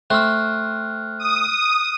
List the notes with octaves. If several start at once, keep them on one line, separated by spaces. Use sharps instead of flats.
A3 C4 F6 F#6
D#6